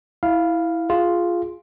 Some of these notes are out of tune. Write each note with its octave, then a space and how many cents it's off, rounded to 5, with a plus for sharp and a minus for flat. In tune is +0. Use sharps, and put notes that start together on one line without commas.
E4 -10 F5 +0
F4 +0 G#4 +0